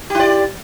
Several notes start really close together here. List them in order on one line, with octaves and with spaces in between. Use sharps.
G4 E4 D5